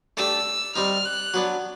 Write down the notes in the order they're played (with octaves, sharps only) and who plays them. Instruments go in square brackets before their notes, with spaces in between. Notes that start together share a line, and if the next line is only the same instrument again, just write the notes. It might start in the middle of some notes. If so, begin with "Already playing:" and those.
[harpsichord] A3 D4 G4 [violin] E6
[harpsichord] G3 C4 D#4 [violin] F6
[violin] F#6
[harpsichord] F#3 B3 D4